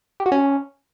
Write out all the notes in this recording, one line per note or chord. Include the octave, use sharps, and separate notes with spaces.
G4
F#4
C#4